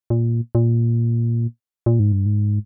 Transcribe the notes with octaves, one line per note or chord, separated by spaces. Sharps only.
A#2
A#2
A#2
G#2
G2
G#2